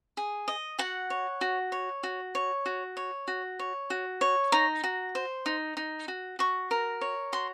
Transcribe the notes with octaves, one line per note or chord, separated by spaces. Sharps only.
G#4
D#5
F#4 F#5
C#5
F#4
C#5
F#4
C#5
F#4
C#5
F#4
C#5
F#4
C#5
D#4 A#5
F#4
C5
D#4
D#4
F#4
F#4 C#6
A#4
C#5
F#4 C6